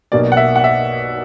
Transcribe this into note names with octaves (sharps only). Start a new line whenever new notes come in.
B1 B2 A#3 D5
F#5
E5
F#5
E5